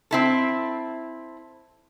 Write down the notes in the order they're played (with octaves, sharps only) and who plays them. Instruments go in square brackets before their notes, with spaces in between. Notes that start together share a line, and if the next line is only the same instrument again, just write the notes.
[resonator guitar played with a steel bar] C4 E4 A4